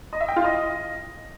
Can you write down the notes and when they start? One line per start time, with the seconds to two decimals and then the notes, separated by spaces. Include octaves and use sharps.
0.13 D#5
0.21 E5
0.28 G5
0.36 F4
0.44 D#5